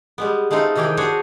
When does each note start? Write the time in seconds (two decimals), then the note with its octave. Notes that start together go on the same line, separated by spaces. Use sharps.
0.18 G3 G#3 B3
0.51 G#3 A3 C4 D#4 F4
0.75 C3 D#3 E3 G4 G#4 G5
0.97 D4 F#4 G#4 C5 C#5